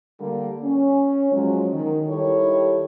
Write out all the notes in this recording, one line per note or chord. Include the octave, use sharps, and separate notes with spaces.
D3 G3 A#3
C#4
F3 F#3 G#3
D#3
D#3 G3 E4 G4 A4 C#5